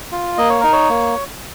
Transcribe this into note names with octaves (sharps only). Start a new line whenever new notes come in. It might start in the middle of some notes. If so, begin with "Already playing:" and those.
F4
A#3 D#5
C#5
D#4 A#4
C#5
A#3